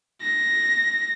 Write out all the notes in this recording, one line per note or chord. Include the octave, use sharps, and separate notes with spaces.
A#6